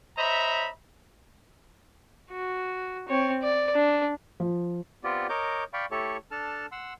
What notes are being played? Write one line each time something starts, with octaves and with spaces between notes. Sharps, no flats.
C5 C#5 D#5 E5 A#5 B5
F#4
C4 C#5
D5
D4
F3
B3 C4 F4 G4 D5
A#4 C#5 D#5 D6 G6
D5 F5 G5 B5 C#6
A3 E4 G4 A4 C#5 C#6
D4 A4 A5 F6
F#5 C6 E6